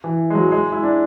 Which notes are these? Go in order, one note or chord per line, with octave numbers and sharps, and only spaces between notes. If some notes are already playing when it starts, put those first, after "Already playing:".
E3
G#3
F#3
G#3
E4
D4